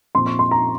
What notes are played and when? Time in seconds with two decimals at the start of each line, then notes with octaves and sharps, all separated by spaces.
0.15 A#2 F3 C4 C6
0.26 C#6
0.39 C6
0.51 A#5